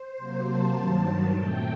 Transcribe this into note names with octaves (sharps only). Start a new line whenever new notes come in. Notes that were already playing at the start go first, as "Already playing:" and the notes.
Already playing: C5
C3 F#3 A#3
A5
G2 D#3 F#3
A#2 A3 C4 G5